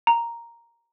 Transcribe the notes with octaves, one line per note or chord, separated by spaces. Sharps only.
A#5